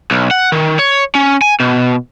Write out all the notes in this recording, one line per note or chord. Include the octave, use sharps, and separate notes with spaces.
B1
F#5
D#3
C#5
C#4
G#5
B2